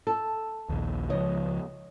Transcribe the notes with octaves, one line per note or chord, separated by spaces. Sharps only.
A4
A#1 D#2
C#2 F3 C#5 D#5